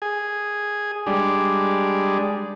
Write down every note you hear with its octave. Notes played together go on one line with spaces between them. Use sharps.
G#4
G3 G#3 D4